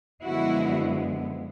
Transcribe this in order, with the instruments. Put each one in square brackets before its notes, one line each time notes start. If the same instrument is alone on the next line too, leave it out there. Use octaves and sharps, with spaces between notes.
[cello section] F#2 D3 F3 G#3 B3 E4 F#4